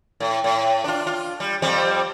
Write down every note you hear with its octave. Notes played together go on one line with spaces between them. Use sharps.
A2
A2
D4 F4
F4
G3
F2 G3 C4